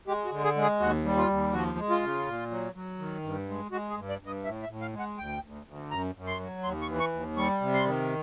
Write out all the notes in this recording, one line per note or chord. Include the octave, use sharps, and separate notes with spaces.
G#3 G4
F#4
D3
G#4
G#3
G#4
D#2 F#4
G3
F4
D#2
F3 F#4
G#3
F4
C#3
A#2
F#3
F#3
D#3
G2
G#3
G#3 F#4
G#4
G2
D5
G2
D#5
A2 E5
E5
A2
F5
G#3
F#5
D2 G5
D2
D2
F#2 A#5
F#2
C6
F#3
D#2 C6
C#6
E3
C#6
D#2
G3 C#6
C3
C6
D#3